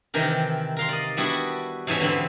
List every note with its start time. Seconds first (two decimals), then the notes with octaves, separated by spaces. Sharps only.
0.14 C3 D#3 E3 G4 A#4
0.77 A#4 F5 C6
0.89 D5 D#5
1.17 G3 B3 D4 E4 F#4
1.87 E2 G#2 E3 C#4 E5 F#5
2.00 D3 E3 C4 B5